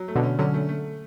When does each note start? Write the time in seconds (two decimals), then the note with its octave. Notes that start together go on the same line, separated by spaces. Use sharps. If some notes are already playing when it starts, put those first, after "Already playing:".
Already playing: F#3
0.08 A3
0.15 B2 D3
0.23 C#4
0.39 D3 F#3 C#4
0.54 A3
0.69 A3